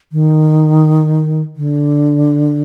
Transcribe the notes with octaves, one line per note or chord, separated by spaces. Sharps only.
D#3
D3